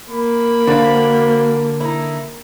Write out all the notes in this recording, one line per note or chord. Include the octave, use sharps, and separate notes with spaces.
A#3 B5
D3 D4 F#4 C5 F5
D#4 E4